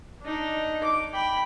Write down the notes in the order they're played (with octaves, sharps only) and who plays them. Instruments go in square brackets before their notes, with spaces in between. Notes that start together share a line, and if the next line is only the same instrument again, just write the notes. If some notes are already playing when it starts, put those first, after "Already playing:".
[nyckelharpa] D4 D#4
D6
G5 B5